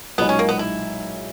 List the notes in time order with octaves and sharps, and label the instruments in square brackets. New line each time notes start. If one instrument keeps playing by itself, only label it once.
[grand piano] B1 A#2 G#3 D#4 [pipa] B3
[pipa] C#4
A#3
B3
E4